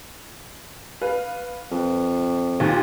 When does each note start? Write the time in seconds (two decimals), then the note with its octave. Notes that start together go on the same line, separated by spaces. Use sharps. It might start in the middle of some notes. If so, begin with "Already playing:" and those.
1.01 B4 F5
1.71 F2
2.60 D#2 A#2